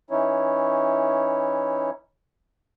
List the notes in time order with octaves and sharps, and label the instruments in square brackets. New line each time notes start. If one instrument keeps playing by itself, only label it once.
[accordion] E3 C#4 D#4 E4 C#5